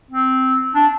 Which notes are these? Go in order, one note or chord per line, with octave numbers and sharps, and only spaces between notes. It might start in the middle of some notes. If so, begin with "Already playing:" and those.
C4
D4